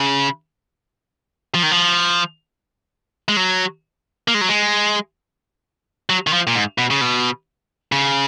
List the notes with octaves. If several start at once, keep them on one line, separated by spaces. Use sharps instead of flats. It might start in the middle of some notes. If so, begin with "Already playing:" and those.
Already playing: C#3
F3
D#3
F3
G#3
F#3
A#3
G#3
F#3
G#3
F#3
D#3
F3
A#2
G#2
B2
C#3
B2
C#3